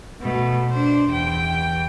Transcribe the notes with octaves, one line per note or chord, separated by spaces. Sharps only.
B2 A3
D4 C5
E2 G5